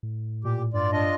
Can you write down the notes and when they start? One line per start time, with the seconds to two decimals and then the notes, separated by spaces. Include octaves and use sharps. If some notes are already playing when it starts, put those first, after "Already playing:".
0.03 A2
0.44 A#2 G4
0.73 G2 F4 D5
0.92 D4 F4 D#5